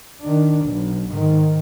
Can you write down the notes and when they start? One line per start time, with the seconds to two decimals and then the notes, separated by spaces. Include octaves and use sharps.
0.21 D#3 D4
0.65 B1
1.10 G#2 D#3